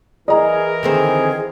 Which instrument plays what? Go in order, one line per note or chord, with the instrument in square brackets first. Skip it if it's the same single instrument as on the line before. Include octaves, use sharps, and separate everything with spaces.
[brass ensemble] E3 A#4 [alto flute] G#4 [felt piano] D#5 A#5
[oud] D3 D#3 C4 [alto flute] G#4